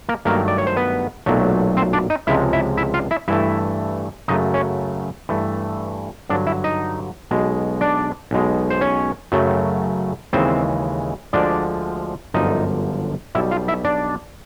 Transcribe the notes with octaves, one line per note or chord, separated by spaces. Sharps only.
A#3 A#4
G2 D#3 F#3 A3 A#3 A#4
D5
C#5
C5
B3 B4
B1 A#2 F#3 A3
C4 C5
D4 D5
D#4 D#5
C#2 C3 F3 G#3 E4 E5
E4 E5
E4 E5
F4 F5
E4 E5
G2 E3 A3 E4 E5
F#2 C#3 F#3 A3 D#4 D#5
C#4 C#5
G2 E3 A3
G2 D3 F#3 D4 D5
E4 E5
D#4 D#5
B1 B2 G#3
D4 D5
B1 B2 G#3
C5
C#4 C#5
F#2 C#3 F#3 A3
D#2 C#3 E3 G#3 C4 C5
D2 D3 F3 G#3 D4 D5
G1 F#2 D3 F3 D#4 D#5
B1 B2 G3 E4 E5
F4 F5
E4 E5
D4 D5